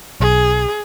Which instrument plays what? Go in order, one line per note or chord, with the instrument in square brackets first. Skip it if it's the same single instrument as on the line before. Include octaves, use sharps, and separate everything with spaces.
[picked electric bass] B1 [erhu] G#4